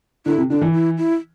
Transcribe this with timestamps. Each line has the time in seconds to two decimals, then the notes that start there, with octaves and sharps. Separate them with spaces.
0.26 D3 E4
0.38 C3
0.50 D3 D4
0.61 E3
0.73 E4
0.97 E4